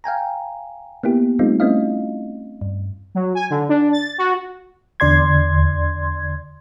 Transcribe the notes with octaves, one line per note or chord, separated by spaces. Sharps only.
F5 G5 G#5 A#5
A#3 B3 E4 G4
G3 A3 C4 D#4 F4
A3 C4 C#4 E4 D#5 F5
G2
F#3
G#5
D3
D4
A6
F#4
E2 D3 D5 C6 G#6